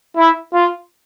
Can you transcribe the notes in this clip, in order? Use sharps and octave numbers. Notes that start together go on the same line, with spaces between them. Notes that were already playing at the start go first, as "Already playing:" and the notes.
E4
F4